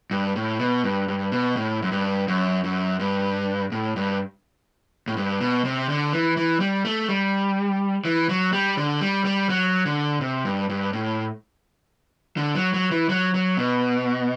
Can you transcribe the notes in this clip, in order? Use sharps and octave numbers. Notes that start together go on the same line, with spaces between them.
G2
A2
B2
G2
G2
B2
A2
F#2
G2
F#2
F#2
G2
A2
G2
A2
G2
B2
C3
D3
E3
E3
G3
A3
G3
E3
F#3
G3
D3
G3
G3
F#3
D3
C3
G2
G2
A2
D3
F#3
F#3
E3
F#3
F#3
B2